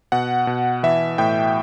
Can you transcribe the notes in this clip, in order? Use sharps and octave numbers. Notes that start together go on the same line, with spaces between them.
B2 F#5
B2
E3 E5
A2 G5